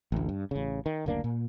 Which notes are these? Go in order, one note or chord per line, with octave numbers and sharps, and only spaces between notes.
A1 D2
G2
A1 C#3
D#3
F#1 D2 A#3 D4
A#2